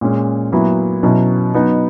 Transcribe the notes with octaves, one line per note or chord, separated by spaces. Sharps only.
A#2 G#3 C#4
A#2 F#3 B3 E4
B2 F#3 C#4 E4
F#3 B3 D#4